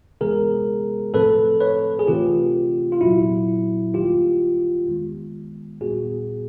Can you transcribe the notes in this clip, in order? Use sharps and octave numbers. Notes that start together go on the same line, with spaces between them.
C3 E3 G#3 B3 G#4 A#4
A2 F3 A3 C4 A4 B4
B4 C#5
G#4
C3 E3 A3 C4 F4 G4
F4
A#2 F#3 B3 E4 F#4
D#3 G3 A#3 F4 G4
D#3 G#3 B3
A#2 G3 B3 F#4 G#4